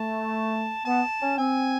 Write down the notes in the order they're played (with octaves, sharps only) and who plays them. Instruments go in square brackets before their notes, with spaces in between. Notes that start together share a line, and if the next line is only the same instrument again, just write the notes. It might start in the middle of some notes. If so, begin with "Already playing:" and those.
Already playing: [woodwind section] A3 [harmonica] A5
[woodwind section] B3 [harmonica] A5
[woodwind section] C#4
[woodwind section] C4 [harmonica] G#5